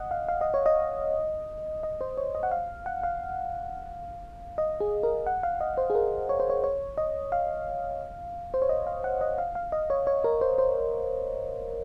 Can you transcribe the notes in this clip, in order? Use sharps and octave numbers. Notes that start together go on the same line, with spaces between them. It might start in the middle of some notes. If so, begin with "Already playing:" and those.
Already playing: D#5 F#5
F5
F5
D#5
C#5
D#5
D#5
C5
C#5
D#5
F#5
F5
F#5
F5
D#5
G#4
A#4
F#5
F5
D#5
C5
G#4
A#4
C#5
C5
C#5
C#5
D#5
F5
C5
C#5
D#5
F5
F#5
D#5
F5
F5
D#5
C#5
C#5
A#4
C5
C5